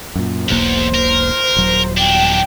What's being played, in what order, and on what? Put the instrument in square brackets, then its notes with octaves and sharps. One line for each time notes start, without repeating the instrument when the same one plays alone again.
[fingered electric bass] F#2 A#2
[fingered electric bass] E1 B1 A#3 [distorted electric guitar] E2 [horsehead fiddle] C5
[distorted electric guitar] A#4
[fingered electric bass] D#1 F#3
[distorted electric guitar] B1 D4 [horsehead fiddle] G5